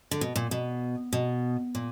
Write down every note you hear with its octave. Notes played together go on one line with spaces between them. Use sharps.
D3
B2
A#2
B2
B2
A#2